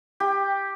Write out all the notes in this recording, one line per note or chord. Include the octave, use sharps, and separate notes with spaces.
G4